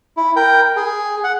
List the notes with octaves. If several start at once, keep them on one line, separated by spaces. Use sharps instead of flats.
E4
A#4 G5
G#4
F#5